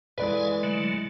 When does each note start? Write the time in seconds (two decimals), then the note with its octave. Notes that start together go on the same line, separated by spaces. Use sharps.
0.18 E3 G#3 A4 B4 D5 F5 G#5
0.63 D3 F#3 A3